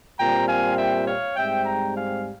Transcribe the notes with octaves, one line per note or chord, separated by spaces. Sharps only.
A#2 G3 C4 G5 A#5
F5 G#5
E5 G5
C#5 F5
G#2 G3 C4 E5 G5
G5 A#5
F5 G#5